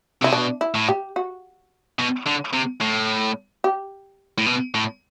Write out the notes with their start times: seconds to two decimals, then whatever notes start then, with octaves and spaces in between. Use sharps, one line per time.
0.22 C3 E4
0.33 B2 D4
0.61 E4
0.75 A2
0.88 G4
1.16 F#4
1.99 B2
2.26 D3
2.53 C3
2.81 A2
3.64 G4
4.38 A2
4.46 B2
4.75 A2